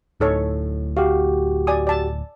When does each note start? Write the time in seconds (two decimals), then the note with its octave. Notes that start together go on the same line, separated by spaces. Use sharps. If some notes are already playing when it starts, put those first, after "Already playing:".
0.20 D1 A2 D#4 A4 C#5
0.97 F#4 G4 F5
1.67 D5 G#5 D#6
1.87 D5 A5